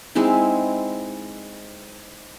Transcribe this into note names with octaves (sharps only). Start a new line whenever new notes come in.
G#3 C4 D#4 E4